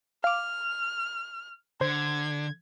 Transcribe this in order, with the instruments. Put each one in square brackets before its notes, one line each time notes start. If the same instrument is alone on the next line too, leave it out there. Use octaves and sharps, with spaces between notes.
[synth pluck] F5 D6 [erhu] F6
[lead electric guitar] D3 [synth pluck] C5 [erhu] G#6